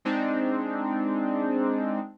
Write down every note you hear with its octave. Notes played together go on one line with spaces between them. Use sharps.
G#3 C4 D4 D#4